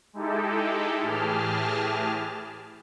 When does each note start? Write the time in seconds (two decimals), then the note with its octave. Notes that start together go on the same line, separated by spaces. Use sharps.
0.13 G#3 D#4 E4 G4 A4
1.01 A2 E3 G4 G#4 A5 F6